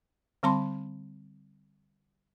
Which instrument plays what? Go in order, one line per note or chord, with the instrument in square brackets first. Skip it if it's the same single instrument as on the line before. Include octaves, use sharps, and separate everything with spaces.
[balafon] D3 G3 C4 A5 B5 C6